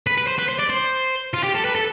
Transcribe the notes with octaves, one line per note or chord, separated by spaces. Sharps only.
B4
B4
C5
B4
C5
D5
C5
F4
G4
A4
B4
A4